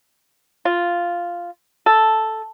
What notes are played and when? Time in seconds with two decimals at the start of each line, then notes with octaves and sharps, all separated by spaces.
0.65 F4
1.86 A4